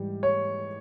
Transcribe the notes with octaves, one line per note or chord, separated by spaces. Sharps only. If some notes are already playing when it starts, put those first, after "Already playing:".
Already playing: G#2 E3 G3
C#5